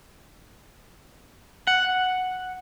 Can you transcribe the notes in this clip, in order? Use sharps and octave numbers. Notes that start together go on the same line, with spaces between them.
F#5